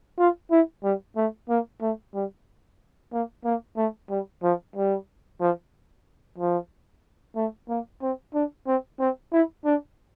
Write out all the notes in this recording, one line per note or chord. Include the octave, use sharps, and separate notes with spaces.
F4
E4
G3
A3
A#3
A3
G3
A#3
A#3
A3
G3
F3
G3
F3
F3
A3
A#3
C4
D4
C4
C4
E4
D4